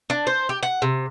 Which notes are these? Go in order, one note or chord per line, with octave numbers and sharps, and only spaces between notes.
D4
C5
G4
F#5
C3